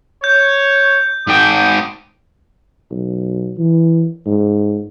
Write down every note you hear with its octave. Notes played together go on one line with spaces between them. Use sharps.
C#5 G6
G#2 G5 D6 D#6
B1
E3
G#2